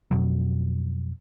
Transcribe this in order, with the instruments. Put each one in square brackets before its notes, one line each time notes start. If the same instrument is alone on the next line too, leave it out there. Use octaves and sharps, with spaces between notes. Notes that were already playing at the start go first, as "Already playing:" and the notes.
[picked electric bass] F2 B2 F#3